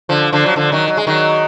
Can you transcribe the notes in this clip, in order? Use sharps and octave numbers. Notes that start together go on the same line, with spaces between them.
D3 F3
D3 F3
F#3
D3 F3
D#3 F#3
F#3
G#3
D#3 F#3